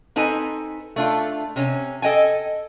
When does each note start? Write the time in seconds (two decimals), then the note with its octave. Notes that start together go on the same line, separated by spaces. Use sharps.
0.16 C4 D#4 A4 B4 G#5
0.96 A3 D4 F4
1.56 C3 C#4
2.02 A4 D#5 G5 G#5